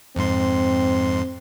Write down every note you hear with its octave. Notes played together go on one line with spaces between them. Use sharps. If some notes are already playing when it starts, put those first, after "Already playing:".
F2 G#2 C4 C6